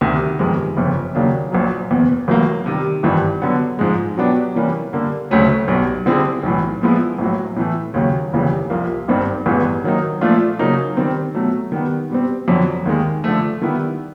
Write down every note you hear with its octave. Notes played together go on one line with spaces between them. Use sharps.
D2 C3 D#3
G1 F2 C3 D#3 G#3
G1 F2 C#3
D#2 C#3 F#3 A#3 D4
A#1 A#2 F#3
F#1 E2 B2
A1 A2 F#3 A#3
C3 D#3 G3
G#1 G2 E3 G3
D3 F#3 B3
G#2 F3 G#3
B2 F#3 B3 D4 G4
C3 E3 G3 A#3 C#4
D3 G3 A#3
D2 C#3 F#3 A3 C#4
B1 B2 G3
D3 G3 C4 E4 G#4
B1 A2 E3
A#2 F3 G#3 B3 E4
A#1 A2 F#3
A2 E3 A3
D#2 C#3 F#3
F1 D#2 C#3 E3 G3
C2 A#2 F3 A#3
G#1 G2 D#3 G3 C4
A1 G2 E3 G#3 B3
D#3 F#3 A#3 D#4
A#2 F3 A3 D4 F4
C#3 F#3 A#3 D#4
D#3 G3 C4
B2 F#3 A3
D#3 G3 B3
B2 G3 C4
F2 D3 F#3
D#2 D#3 G#3
D3 F3 A3
D#3 G3 B3 E4